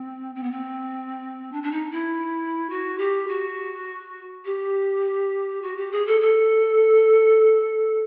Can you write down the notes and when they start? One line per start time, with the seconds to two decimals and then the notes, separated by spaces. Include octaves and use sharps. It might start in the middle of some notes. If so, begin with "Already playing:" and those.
Already playing: C4
0.35 C4
0.43 B3
0.51 C4
1.52 D4
1.63 D4
1.71 D#4
1.91 E4
2.70 F#4
2.98 G4
3.28 F#4
4.45 G4
5.62 F#4
5.77 G4
5.92 G#4
6.06 A4
6.21 A4